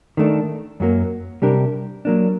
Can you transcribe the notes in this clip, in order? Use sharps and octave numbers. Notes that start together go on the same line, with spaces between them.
D#3 A3 D4
F#2 F#3 A#3
C3 G3 D4 G4 A#4
F#3 A#3 D4